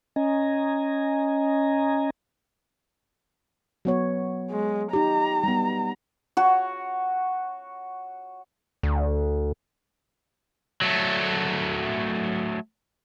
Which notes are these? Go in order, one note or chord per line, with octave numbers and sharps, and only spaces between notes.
C#4 D#5 G#5 A#5
F#3 B3 C#5
G#3
D#4 G4 A#5
G3 B3
F#4 C#5
D2
F#3 A3